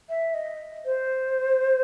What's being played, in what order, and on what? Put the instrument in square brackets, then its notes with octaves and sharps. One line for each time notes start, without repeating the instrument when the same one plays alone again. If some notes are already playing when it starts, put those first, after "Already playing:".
[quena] E5
D#5
C5